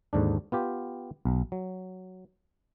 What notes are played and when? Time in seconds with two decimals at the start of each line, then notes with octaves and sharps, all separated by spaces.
0.13 D#2 G#2 D3 D4
0.52 B3 F4 G4
1.25 B1
1.52 F#3